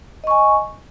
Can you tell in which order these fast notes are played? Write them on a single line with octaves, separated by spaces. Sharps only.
D#5 C#6 G#5